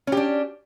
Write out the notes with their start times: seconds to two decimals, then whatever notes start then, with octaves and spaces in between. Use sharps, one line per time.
0.07 C#4
0.12 G4
0.17 D4